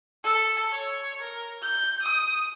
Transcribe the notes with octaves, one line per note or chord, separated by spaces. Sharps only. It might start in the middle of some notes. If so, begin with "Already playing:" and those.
A4
C#5
A#4
G6
D#6